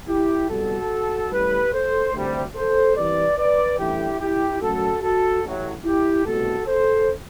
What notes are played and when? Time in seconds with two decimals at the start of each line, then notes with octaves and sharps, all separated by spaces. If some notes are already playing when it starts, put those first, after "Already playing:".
0.08 E4 G4
0.49 C2 B2 G3 F#4 A4
1.32 A1 A2 G3 G4 B4
1.73 A4 C5
2.14 D2 C3 G3
2.55 A4 C5
2.96 C2 C3 E3 B4 D5
3.37 B4 D5
3.78 A1 G2 E3 A3 E4 G4
4.20 E4 G4
4.61 F#2 F#3 A3 F#4 A4
5.02 F#4 A4
5.43 A1 A2 F#3
5.84 E4 G4
6.25 C2 B2 A3 F#4 A4
6.66 A4 C5